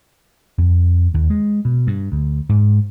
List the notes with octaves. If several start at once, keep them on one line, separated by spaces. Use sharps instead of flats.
F2
D#2
G#3
B2
G2
D2
G#2